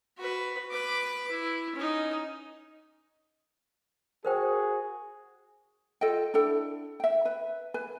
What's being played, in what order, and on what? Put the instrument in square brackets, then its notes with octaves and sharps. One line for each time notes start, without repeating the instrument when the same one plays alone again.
[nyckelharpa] F#4 B4
B4 D6
E4
C#4 D#4
[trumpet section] F#4 G#4 [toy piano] A#4 C5 G5
[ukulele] F4 A4 D#5 G5
D4 E4 A4 G5
E5 G5
B4 E5
B4 G#5